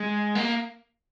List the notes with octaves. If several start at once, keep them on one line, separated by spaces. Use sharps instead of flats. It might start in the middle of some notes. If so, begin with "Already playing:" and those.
Already playing: G#3
A#3